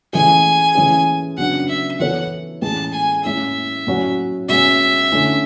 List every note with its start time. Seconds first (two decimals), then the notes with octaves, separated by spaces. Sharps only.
0.13 E3 A3 C#4 G#4 G#5
0.75 E3 A3 C#4 G#4
1.38 C#3 F#3 B3 D4 F#5
1.68 E5
2.00 E3 B3 E4 A4 C#5 F#5
2.62 A2 E3 G#3 C#4 G#4 A5
2.93 G#5
3.24 A2 G#3 C#4 E4 E5
3.87 A2 F#3 C#4 F#4 C#5
4.49 B2 G#3 C#4 E5
5.11 D3 A3 C#4 E4